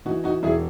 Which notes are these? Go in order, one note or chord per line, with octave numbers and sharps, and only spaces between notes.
E3 D#4 F#4
D#4 F#4
E1 E4 G#4